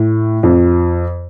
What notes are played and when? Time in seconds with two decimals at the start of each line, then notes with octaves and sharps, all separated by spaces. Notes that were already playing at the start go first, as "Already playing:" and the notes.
Already playing: A2
0.43 F2